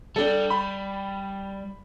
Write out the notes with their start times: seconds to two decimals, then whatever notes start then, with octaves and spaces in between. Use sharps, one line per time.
0.16 G3 D4 A4
0.50 B5